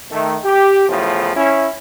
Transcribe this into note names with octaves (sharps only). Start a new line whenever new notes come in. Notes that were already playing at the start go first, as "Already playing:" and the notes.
D#3 A3
G4
E2 A2 C#3 F3
C#4 E4